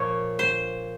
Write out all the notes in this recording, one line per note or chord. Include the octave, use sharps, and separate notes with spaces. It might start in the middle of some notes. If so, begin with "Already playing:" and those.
Already playing: A#2 F3 A#3 C#5
C5